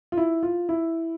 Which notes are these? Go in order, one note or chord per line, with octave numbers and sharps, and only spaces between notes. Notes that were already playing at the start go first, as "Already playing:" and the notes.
F4
E4
F4
E4